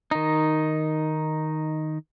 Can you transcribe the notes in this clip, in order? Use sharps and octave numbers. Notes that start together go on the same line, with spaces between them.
D#3 D#4